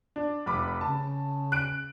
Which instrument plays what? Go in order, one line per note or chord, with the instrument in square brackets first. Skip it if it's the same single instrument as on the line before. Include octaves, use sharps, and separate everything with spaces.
[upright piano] D4
F1 B5 D6
[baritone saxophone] C#3 [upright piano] A5
[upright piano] F#6 D7